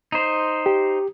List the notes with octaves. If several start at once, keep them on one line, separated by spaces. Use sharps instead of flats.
D#4 C5
G4